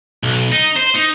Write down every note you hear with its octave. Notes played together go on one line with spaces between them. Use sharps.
B1
D#4
C5
D#4